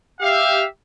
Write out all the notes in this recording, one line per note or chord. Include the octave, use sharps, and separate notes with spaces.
G4 E5 F5